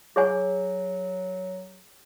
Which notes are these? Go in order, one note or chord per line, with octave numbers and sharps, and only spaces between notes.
F#3 G#4 C#5 G#5